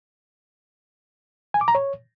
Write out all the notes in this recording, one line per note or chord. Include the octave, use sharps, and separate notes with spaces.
G#5
D6
A#5
C#5